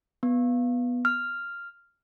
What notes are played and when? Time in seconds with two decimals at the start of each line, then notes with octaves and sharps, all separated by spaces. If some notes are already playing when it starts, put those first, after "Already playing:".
0.23 B3
1.05 F6